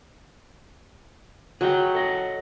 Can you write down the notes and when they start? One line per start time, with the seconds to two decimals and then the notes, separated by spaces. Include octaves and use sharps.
1.61 F#3 G#4 D#5 G5
1.95 A4 D#5 F#5